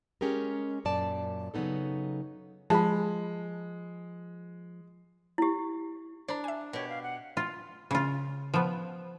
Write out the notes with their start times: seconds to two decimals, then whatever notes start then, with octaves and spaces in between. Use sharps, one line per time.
0.21 G#3 C#4 G4 G#4 A#4
0.85 F#2 A#2 D5 A5
1.54 C#3 F#3 G#3 B3 D#4 A4
2.70 F3 G#3 A5 B5
5.38 E4 G4
6.28 D4 C5 A#5
6.44 E5 G#5
6.73 B2 G4 C#5
6.89 F5
7.03 F#5
7.37 F4
7.91 C#3 F4
8.54 F3 B3